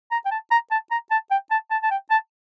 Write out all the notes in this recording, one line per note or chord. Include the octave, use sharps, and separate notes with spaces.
A#5
G5
A5
A#5
A5
A#5
A5
G5
A5
A5
A5
G5
A5